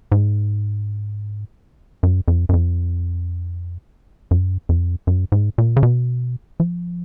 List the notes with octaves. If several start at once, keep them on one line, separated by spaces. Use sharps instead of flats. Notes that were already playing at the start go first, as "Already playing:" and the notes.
G#2
F#2
F2
F#2
F2
F#2
F2
F#2
G#2
A#2
C#3
B2
F3